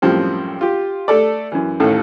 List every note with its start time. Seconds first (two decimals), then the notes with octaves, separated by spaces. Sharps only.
0.02 F#2 A2 F3 G3 C4
0.61 F4 G4
1.08 A3 A4 D5
1.52 F#2 E3
1.80 A1 D#2 A2 A4